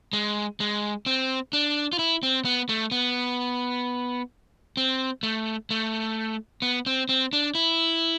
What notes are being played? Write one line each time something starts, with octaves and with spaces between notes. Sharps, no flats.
G#3
G#3
C4
D4
F4
E4
C4
B3
A3
B3
C4
A3
A3
B3
C4
C4
D4
E4